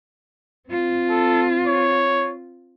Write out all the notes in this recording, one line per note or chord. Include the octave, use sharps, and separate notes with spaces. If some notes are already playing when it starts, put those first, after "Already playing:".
C4 F4
A4
C#5